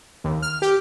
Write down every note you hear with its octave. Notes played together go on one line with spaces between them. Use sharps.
D#2
F6
G4